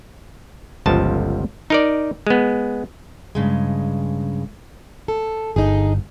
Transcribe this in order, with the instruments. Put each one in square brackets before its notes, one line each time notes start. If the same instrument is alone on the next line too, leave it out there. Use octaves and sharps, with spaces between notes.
[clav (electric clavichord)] G1 C#2 F3 A5
D#4 A#4 D5
G#3 B3
[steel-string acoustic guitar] G2 C#3 G#3
A4
[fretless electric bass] G1 [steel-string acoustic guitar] D#4 G#4